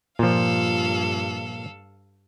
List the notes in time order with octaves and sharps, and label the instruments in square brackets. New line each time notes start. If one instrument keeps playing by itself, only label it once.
[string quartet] G2 A4 F5 [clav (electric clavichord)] A#2 F3